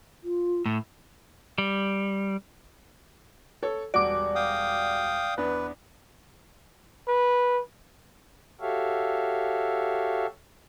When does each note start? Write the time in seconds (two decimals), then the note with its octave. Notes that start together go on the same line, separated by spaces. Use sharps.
0.24 F4
0.66 A2
1.58 G3
3.63 A4 C#5
3.94 E1 G3 F#4 D5 D6
4.35 F5 G5 D#6
5.38 E2 B3 D4 B4
7.08 B4
8.61 F#4 G4 A4 C#5 E5 F5